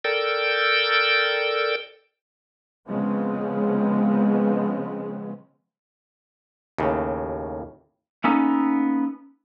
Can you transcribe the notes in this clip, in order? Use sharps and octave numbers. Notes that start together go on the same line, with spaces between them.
A4 A#4 D5 G5 E6 G6
C#3 F3 G#3 B3 C4
D#2 A2 C#3
A#3 B3 C#4 D#4 A4